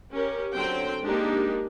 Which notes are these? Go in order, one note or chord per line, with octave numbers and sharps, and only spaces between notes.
C#4 G4 A#4
D3 F#3 C4 C5 G5
G#3 A#3 D4 D#4 G4